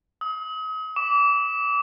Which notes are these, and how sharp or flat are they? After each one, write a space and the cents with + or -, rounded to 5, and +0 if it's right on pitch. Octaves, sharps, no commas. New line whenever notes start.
D#6 +40
D6 -35